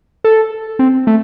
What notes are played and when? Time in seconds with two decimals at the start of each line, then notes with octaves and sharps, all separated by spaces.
0.24 A4
0.79 C4
1.07 A3